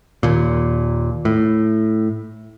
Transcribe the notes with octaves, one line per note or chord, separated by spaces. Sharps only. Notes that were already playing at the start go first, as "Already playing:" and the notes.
D#2 A#2
A2